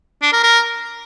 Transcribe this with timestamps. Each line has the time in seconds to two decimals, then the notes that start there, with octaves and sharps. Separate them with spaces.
0.22 D4
0.33 A#4
0.43 A#4